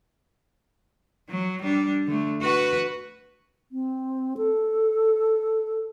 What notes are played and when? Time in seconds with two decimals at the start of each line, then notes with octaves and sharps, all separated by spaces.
1.30 F#3
1.62 G3 D4
2.07 D3 A3
2.41 F#4 B4
3.72 C4
4.37 A4